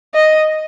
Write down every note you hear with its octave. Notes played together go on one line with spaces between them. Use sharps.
D#5